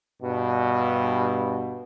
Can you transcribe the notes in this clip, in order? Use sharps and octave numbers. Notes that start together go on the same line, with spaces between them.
G2 B2